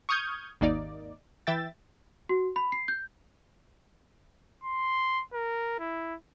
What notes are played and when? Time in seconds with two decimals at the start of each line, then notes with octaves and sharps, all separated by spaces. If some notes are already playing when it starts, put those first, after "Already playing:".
0.09 C#6 D#6 F6 G6 G#6
0.61 G#1 D#2 A#3 D#4 D5
1.47 E3 E5 G5 A6
2.29 F#4
2.56 B5
2.72 C7
2.88 G6
4.64 C6
5.33 A#4
5.79 E4